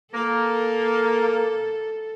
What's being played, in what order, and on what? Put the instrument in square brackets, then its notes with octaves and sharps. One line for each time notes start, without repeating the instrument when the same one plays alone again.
[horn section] A#3 [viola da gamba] A4